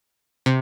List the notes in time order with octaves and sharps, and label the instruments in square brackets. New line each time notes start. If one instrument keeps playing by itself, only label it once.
[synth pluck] C3